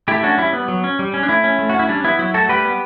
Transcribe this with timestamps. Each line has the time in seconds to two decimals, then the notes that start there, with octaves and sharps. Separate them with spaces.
0.08 A3 E4 G4
0.23 C#4 D4 F#4
0.38 G3 E4
0.53 B3
0.68 F#3
0.84 C#4
0.99 G3
1.14 C#4
1.23 D4
1.28 A3 E4
1.44 C#4
1.59 A3
1.69 C#4 F#4
1.79 E4
1.89 G3 D4
2.04 B3 E4
2.19 F#3 E4
2.34 A3 F#4 A4
2.49 G3 G4 B4
2.65 B3